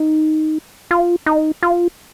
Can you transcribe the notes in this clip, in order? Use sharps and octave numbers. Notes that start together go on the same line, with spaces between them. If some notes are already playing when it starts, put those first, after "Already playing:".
Already playing: D#4
F4
D#4
F4